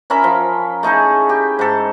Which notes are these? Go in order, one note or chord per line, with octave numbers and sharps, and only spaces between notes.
C#4 A#4 E5 B5
F3
A3 D#4 E4 G#4
G4
G#2 A4